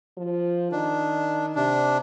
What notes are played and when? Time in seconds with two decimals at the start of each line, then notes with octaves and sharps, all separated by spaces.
0.17 F3
0.72 D#3 D4
1.55 C3 D4